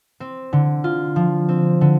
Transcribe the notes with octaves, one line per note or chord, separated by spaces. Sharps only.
C4
D3
F4
F3
C4
D3